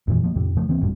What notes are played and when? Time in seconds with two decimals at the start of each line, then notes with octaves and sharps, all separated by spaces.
0.08 F2 A#2 E3
0.24 F3 A#3
0.36 F2 A2 C3
0.57 C#3 F3 A3
0.68 D#2 E3 A#3 C4
0.81 F#1 F2 A2 G3